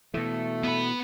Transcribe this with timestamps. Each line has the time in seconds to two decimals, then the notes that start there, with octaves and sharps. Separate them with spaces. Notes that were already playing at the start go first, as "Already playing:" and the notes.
0.14 B2 E3 A3
0.64 B3 B4